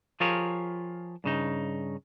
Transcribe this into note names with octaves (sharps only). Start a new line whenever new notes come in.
F3 F4 G4 G#4 A#4 C#5
G2 C#3 D#4